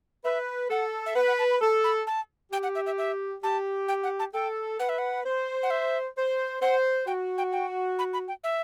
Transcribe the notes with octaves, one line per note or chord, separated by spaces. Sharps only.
B4 E5
A4 F#5
E5
B4 F#5
F#5
A5
B5
A4 A5
B5
A5
G4 G5
F#5
E5
E5
E5
G4 A5
G5
F#5
A5
A4 G5
B4 F#5
E5
F#5
C5
F#5
E5
C5
C5 F#5
F#4 G5
G5
G5
B5
B5
G5
E5